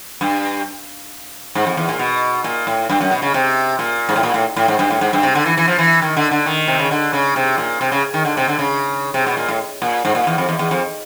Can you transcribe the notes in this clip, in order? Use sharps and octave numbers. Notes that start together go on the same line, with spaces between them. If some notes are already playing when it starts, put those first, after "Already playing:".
G2
G#2
F2
E2
A#2
B2
A#2
A2
G2
F#2
B2
C#3
C3
A#2
G#2
A2
A#2
A2
A2
G#2
G2
A2
G#2
G2
C3
D3
E3
E3
F3
E3
D#3
D3
D3
D#3
C3
C#3
D3
C#3
C3
A#2
C3
C#3
D#3
D3
C3
D3
C#3
C3
B2
A#2
A2
A#2
G#2
A#2
E2
F2
E2
E2
F2